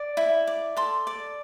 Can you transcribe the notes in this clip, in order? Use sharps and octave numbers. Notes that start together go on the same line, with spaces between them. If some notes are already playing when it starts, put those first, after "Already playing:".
Already playing: D5
E4
D5
A4 C6
D5